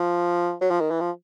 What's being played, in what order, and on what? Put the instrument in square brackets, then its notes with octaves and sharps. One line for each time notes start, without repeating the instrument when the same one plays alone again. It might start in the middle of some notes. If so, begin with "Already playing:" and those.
Already playing: [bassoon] F3
F#3
F3
D#3
E3
F3